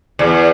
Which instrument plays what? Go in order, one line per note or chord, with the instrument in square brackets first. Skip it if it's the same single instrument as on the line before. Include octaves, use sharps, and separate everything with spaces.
[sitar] E2